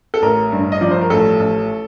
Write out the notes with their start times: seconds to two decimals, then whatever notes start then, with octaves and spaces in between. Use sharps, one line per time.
0.14 A4
0.22 A1 A#4
0.52 G2
0.72 D#5
0.81 F3 D5
0.91 C5
1.01 A#4
1.10 A1 A4
1.39 A1